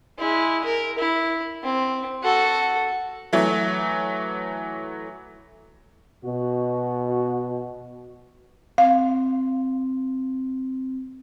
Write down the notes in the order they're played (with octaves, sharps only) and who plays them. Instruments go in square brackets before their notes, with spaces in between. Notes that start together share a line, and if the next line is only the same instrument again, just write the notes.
[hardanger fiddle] G#3 E4
A#4
E4
C4
F#4 A4
[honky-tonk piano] E3 F#3 A3
[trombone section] B2 F#4
[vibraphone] C4 [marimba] F5